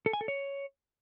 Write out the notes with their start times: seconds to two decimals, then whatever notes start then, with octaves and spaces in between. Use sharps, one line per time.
0.06 A4
0.13 G#5
0.21 A4
0.28 C#5